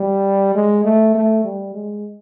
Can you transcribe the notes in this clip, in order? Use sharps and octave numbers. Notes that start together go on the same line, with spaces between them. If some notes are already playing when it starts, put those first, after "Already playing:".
Already playing: G3
G#3
A3
A3
G3
G#3